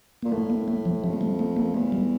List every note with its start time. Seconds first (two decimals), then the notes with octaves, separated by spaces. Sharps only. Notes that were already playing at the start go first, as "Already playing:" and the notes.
0.23 A#2 A#3
0.32 A2 A3
0.50 A#3
0.68 A3
0.85 F3
1.04 F2 F3
1.13 A3
1.21 G3
1.39 A3
1.57 A#3
1.74 E2 A3
1.92 G3